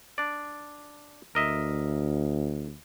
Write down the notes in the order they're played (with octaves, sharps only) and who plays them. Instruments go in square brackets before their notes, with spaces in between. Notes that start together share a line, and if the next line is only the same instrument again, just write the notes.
[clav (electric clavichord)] D4 D5
[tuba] D2 [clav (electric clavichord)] A#4 D#5 E5